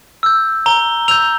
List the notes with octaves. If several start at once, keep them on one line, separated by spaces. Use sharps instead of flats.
E6 G6
A#5 G7
E6 G6 F7